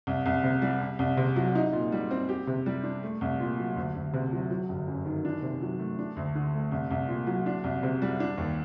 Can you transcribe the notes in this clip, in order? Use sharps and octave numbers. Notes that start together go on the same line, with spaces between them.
C2
C2
C3
G3
C2
C2
C3
F#3
D#4
A#2
G3
C4
G4
C3
G3
D4
A3
C2
A#2
F#3
D2
D2
C3
F#3
F#3
G1
F#2
D#3
D4
C3
F#3
A3
D4
D2
D3
A3
C2
C2
A#2
F#3
D4
C2
C3
G3
D4
D#2